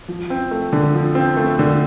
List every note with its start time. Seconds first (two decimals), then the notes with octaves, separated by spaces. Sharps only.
0.08 F3
0.30 C4
0.51 A3
0.73 D3
0.94 F3
1.15 C4
1.37 A3
1.59 D3